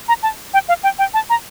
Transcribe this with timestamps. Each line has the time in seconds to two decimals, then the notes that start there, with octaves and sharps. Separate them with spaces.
0.08 A#5
0.23 A5
0.54 G5
0.68 F5
0.83 G5
0.99 G5
1.14 A5
1.30 A#5